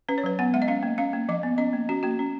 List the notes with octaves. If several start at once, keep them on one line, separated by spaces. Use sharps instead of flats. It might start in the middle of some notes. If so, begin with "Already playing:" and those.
C#4 B4
C#5
F#3 B4
B3 F#5
G#3 F#5
D#5
C#4 F5
A#3
C#4 F5
A#3
F3 D#5
B3
C#4 D#5
A#3
C#4 F#4
A#3 F#4
C#4